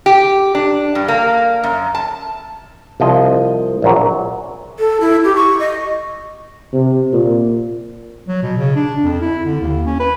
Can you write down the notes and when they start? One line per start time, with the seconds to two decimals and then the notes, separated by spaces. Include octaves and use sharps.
0.06 G4
0.55 D4
0.95 G2
1.08 A#3
1.63 F#2
1.95 A5
3.00 C2 F3 D#5
3.82 A#1 A#2 F#3
4.79 A4
5.01 E4
5.24 G4
5.36 C#6
5.60 D#5
6.73 C3
7.13 A#2
8.28 F#3
8.43 B2
8.58 C#3
8.76 D4
9.03 F2
9.21 E4
9.46 D3
9.61 D#2
9.86 C#4
10.00 B4